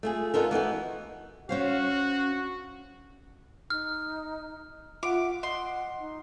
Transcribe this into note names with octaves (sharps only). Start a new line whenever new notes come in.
A3 F4 G#4
B3 D#4 F4 A4 A#4
E3 B3 D#4 F#4
C#4 F#4 C5 F5
D#4 F6
F4 E5 F#5 D6
D#5 F#5 C6
D#4